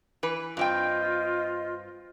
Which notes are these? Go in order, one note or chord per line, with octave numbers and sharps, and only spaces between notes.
E3 B4
G2 C4 F4 D#5 G5